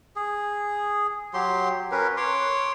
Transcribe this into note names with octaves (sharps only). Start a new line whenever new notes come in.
G#4
F#3 G4 C6
C#4 A#4 B4
C#5 C6 D6